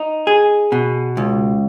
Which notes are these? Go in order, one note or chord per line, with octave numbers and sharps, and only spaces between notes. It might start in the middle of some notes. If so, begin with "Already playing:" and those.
Already playing: D#4
G#4
B2
C#2